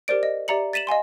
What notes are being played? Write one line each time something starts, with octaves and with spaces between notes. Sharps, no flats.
G4 A#4 C5 D5 D7
D#5
G4 D5 E5 A#5 C#7 F#7
A6 B6 D#7 E7 F#7
D#5 F5 G#5 C6